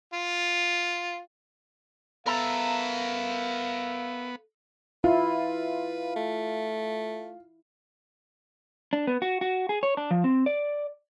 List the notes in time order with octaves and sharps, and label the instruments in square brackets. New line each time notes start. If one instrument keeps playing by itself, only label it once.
[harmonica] F4
[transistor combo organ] B3 [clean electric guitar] A4 A#5 [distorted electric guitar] A#4 E5 [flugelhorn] F5
[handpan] E4 [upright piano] F4 [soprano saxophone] B4
[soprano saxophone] A3
[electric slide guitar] D4
B3
F#4
F#4
G#4
C#5
D4
F3
C4
D5